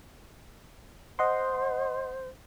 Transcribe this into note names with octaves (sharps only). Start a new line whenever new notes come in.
C5 D#5 F#5 C6